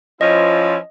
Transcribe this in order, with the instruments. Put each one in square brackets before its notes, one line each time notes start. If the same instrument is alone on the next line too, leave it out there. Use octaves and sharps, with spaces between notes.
[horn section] F3 C#4 E4 [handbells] D#5